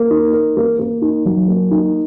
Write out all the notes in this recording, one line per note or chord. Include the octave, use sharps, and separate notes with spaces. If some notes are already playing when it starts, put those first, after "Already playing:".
Already playing: A#3
D#4
A#4
A#3
A#3
D#4
F#3
A#3
D#4